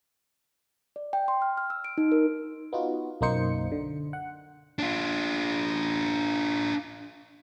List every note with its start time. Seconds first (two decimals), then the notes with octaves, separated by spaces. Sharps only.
0.96 D5
1.13 G5
1.28 C6
1.42 F6
1.57 F6
1.70 E6
1.84 D7
1.98 D#4
2.12 A#4
2.73 B3 D#4 F4 F#4
3.21 B1 F#2 A#3 D#4 C5 C#7
3.72 D3
4.13 F#5
4.79 D4 F4